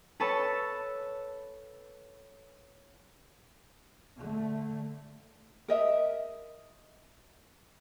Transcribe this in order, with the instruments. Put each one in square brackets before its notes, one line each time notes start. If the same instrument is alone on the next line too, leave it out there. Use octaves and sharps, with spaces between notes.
[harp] A4 B4 C#5 A5 E6
[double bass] D3 A3
[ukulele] A#4 D#5 E5